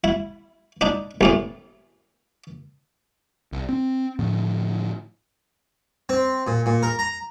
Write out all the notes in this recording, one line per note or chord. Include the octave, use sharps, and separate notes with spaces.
E4
D4 D#4
A1 E2 A2
C2
C4
A2 D3 F3 A3
C4
A#2
A#2
A#4
A#5